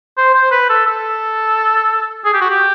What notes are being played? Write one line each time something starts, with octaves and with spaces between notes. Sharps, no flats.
C5
C5
B4
A4
A4
G#4
G4
F#4
G4